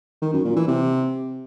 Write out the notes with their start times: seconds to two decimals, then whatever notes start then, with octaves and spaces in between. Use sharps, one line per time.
0.22 D#3
0.33 F#2
0.45 A#2
0.56 E3
0.68 C3